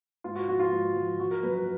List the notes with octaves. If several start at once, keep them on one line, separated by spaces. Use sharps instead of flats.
G#2 F4
F#4
F3 F#4
F4
G#2
F3
F3 F#4
A#4
F#2 B4
B4